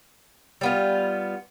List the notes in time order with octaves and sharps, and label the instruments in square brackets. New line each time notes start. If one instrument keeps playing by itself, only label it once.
[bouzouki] G3 B3 F4